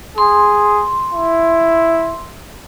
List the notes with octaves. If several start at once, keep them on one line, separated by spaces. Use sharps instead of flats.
G#4 C6
E4